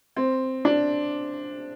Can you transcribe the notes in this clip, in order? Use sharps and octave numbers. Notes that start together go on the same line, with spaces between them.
C4
D4